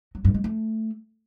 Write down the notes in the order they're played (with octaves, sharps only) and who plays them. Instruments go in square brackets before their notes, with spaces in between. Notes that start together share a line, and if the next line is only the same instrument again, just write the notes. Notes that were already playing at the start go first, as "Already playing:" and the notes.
[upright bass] F#3
G2
G#3
A3